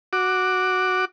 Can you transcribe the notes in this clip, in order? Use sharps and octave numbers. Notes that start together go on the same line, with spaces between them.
F#4 D6